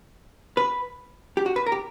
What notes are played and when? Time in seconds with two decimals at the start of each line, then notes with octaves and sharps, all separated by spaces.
0.57 B4
1.37 G4
1.46 F#4
1.56 B4
1.66 A#4
1.72 G4